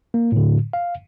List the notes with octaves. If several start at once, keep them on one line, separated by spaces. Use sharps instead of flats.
A#3
A2 D3
F5